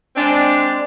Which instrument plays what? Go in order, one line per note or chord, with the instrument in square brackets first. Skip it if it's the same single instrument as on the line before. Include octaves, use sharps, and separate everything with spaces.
[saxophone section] G#3 C4 D4